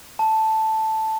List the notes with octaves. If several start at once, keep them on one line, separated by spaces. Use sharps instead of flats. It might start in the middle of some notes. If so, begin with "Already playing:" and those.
A5